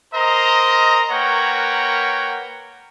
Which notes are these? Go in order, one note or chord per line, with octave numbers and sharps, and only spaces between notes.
A#4 C5 D#5 A#5
A#3 A#4 B4 C#5 F#5 G5